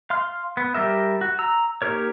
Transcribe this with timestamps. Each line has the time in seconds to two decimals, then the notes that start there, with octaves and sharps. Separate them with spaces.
0.10 F5 C6 F6
0.57 B3
0.74 G3 G4 A#4 E5
1.21 F#4
1.39 A#5 E6
1.82 A#3 D#4 G4 A#4 C#5